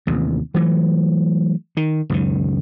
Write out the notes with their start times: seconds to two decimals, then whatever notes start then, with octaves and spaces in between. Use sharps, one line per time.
0.07 A1 D#2 C3
0.54 E3 F#3 A3
1.77 D#3
2.10 C#2 F#2 D#3